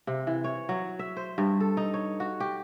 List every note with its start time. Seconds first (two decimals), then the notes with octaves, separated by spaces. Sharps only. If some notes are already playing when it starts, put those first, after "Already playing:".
0.07 C3
0.27 E3
0.44 C#5
0.69 F#3
0.99 E5
1.17 C5
1.38 G2
1.60 A4
1.77 D#4
1.94 C#5
2.20 F#4
2.40 G4